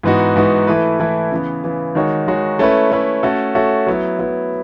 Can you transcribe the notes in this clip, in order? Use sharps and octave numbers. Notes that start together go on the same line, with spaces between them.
G#2 E3 B3 D#4 F#4
G#2 E3 B3 D#4 F#4
E3 A3 E4 B4
E3 A3 E4 B4
C#3 E3 B3
C#3 E3 B3
D#3 G#3 D#4 F#4 C#5
D#3 G#3 D#4 F#4 C#5
A3 C#4 E4 B4
A3 C#4 E4 B4
A3 C#4 F#4 A4 E5
A3 C#4 F#4 A4 E5
F#3 B3 E4
F#3 B3 E4